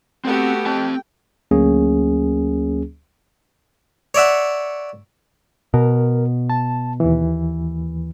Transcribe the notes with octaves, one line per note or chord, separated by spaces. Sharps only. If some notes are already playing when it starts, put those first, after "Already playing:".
A3 B3 C4 F#4 G4
C4 G5 A5
D2 F#3 A#3 C#4 G#4
C#5 D5 E5 F#5
B2 A#4
A5
D#2 E3